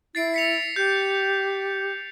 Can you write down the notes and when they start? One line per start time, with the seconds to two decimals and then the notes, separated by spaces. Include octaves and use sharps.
0.15 E4 A6 C7 D7
0.34 B6 C#7 F7
0.76 G4 G6